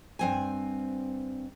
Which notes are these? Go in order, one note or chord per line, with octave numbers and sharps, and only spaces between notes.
G2 C4 G#5